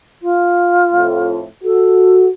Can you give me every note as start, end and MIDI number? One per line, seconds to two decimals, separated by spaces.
0.22 1.36 65
0.93 1.45 41
0.93 1.45 45
1.64 2.28 66
1.64 2.25 69